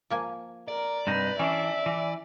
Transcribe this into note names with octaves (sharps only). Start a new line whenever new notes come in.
F3 A#3 G#5
A#4 D5
G2 C3 D#4 B4
E3 C#4 D4 E5
E3